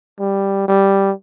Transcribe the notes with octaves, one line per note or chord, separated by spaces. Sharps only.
G3
G3